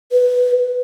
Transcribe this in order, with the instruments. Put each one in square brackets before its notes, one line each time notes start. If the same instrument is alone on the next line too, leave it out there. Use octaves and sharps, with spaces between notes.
[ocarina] B4